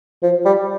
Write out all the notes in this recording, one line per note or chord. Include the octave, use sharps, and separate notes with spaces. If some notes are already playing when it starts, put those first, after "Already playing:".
F3
G3